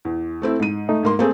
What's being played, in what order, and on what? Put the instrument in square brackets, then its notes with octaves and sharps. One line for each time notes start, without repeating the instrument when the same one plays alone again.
[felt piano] E2
A3 C4 E4
G#2 D#7
[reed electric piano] A3 D#4
[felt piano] G#2 A#3 C6
[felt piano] A3 C4 G#4 [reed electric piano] A#3